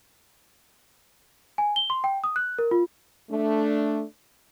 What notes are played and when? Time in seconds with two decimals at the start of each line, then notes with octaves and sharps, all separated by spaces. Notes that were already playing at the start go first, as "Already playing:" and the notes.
1.58 G#5
1.76 G7
1.90 C6
2.04 G5
2.24 D#6
2.36 F#6
2.59 A#4
2.71 F4
3.30 A3 D4